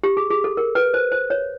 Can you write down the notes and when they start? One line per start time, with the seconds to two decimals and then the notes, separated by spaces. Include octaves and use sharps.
0.03 G4
0.17 G#4
0.30 G#4
0.44 A4
0.57 A#4
0.75 B4
0.94 C5
1.12 C5
1.30 C#5